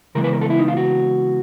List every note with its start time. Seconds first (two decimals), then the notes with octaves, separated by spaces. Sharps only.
0.15 C#3 E3 G#3 B3 A#4
0.24 B4
0.33 A#4
0.41 A4
0.50 E4
0.59 D#4
0.68 F4
0.77 F#4